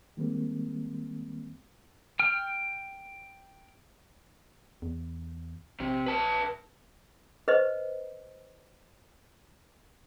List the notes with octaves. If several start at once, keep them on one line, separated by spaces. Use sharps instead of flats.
D#3 G3 G#3 A#3 C4
G5 F6
E2
A#1 C3
B4 A5
B4 C5 D#5